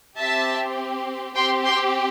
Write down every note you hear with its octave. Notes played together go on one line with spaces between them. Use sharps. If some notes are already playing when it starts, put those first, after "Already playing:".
C4 G4 E5 A5
C4 G4 G5 C6
G5 C6